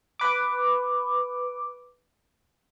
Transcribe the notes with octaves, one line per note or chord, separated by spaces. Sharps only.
B4 D6